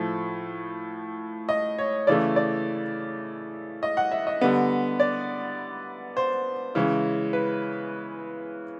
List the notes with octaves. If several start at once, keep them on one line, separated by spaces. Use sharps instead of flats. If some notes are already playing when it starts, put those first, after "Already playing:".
Already playing: A2 F3 A3
D#5
C#5
C#3 E3 A3 D5
D5
D#5
F#5
E5
D#5
D3 G3 B3
D5
C5
C#3 E3 G#3
B4